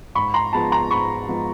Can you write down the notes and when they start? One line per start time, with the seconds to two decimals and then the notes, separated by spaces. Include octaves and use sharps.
0.15 G#2 B5 C#6
0.34 A#5 C6
0.53 F3 G#3 B3 A5 B5
0.72 A#5 C6
0.91 G#2 B5 C#6
1.28 F3 G#3 B3